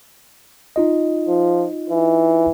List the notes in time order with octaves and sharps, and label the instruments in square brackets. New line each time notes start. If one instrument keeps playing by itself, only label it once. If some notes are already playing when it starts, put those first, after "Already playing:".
[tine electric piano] D#4 F4 D#5
[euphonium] F3
E3